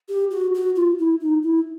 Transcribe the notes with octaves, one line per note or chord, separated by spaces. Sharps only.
G4
F#4
F#4
F4
E4
D#4
E4